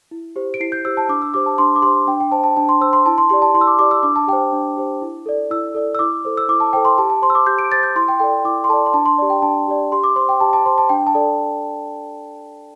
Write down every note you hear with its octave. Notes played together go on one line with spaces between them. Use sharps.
E4
G4 C5
D7
E4 C7
G6
G4 C5 E6
A5
D4 D6
E6
G4 C5 D6
A5
D4 C6
D6
G4 C5 C6
D4 G5
G5
C5 A5
A5
D4 A5
C6
C5 E6
C6
E4 A5
C6
G4 D5 C6
A5
E4 C6
E6
D6
G4 D5 D6
E6
D4 D6
A5
G4 G5
C5
D4
G4 C5
E4
A4 D5
E4 E6
A4 D5
E6
E4 D6
A4 C5
E6
E4 D6
A5
A4 C5 G5
C6
G4 A5
A5
C5 C6
E6
D6
G4 G6
D7
C5 A6
G6
E4 C6
G5
A4 D5 G5
E4 D6
C6
A4 D5 A5
C6
D4 A5
C6
G4 D5
G5
D4 A5
G4 D5
G4 C6
D6
C5 C6
G5
G4 A5
A5
C5 C6
A5
D4 G5
A5
A4 D5